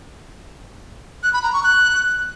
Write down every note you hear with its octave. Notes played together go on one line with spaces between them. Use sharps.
F#6
B5
A#5
C#6
F#6